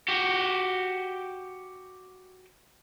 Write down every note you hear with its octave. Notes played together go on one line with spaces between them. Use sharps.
F#4 G4